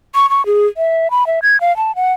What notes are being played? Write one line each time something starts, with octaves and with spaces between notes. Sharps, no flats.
C#6
C#6
G#4
E5
B5
E5
G#6
F5
A5
F#5